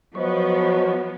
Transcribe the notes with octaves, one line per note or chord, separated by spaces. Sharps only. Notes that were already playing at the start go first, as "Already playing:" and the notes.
F3 F#3 B3 C5 D#5 C#6